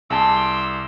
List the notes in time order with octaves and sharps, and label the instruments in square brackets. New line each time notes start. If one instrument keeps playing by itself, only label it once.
[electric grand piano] C2 [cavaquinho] G#4 A5 [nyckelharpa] C6 D6 [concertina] E6